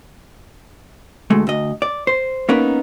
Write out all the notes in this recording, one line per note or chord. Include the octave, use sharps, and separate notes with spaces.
D2 G#3 A3
D2 D#5
D5
C5
A#3 B3 C#4 D#4 A#4 B4